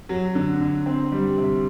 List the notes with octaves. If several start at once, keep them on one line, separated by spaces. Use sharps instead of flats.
F#3
D3
D3
C4
G3
C3